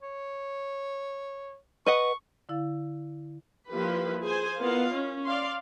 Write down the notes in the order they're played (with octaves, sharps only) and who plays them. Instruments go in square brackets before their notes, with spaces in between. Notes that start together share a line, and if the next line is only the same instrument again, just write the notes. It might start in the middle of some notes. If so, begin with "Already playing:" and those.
[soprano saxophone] C#5
[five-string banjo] B4 D#5 F#5 [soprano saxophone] C#6
[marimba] D3 E4 F5 A6
[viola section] F3 G3 A#3 E4 G4 B4
G#4 C5 G#5
B3 E4 F4 A#4 D#5 F5
C#4
D5 F5 C6